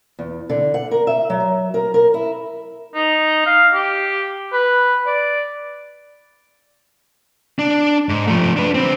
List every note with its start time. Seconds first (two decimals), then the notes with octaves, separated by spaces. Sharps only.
0.19 E2
0.49 D3
0.74 F#5
0.91 A#4
1.07 E5
1.30 F#3
1.74 A#4
1.94 A#4
2.14 E4
2.95 D#4
3.46 F5
3.74 G4
4.53 B4
5.06 D5
7.59 D4
8.09 G#2
8.27 F3 A3
8.56 D4 B4
8.75 D3 C4